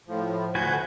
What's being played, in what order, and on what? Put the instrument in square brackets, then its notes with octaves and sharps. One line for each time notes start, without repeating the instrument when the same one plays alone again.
[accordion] A2 F3
[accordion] D2 F#5 G6 [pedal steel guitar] F#4 B4 G#5